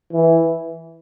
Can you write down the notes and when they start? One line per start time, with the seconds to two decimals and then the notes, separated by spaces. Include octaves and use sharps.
0.13 E3